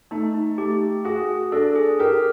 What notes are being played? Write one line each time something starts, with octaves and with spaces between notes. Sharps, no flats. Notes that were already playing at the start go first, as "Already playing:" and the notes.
A3 D#4
D#4
A3 G4
F#4 G#4
D4 A4
G#4
G4 A#4